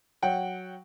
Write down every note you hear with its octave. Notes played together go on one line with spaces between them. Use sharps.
F#3 F#5 G5